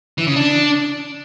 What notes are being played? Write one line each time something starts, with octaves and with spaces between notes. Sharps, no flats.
E3
C#3
D4